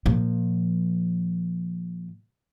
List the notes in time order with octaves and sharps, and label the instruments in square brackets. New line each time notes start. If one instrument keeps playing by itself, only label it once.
[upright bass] A#2 F3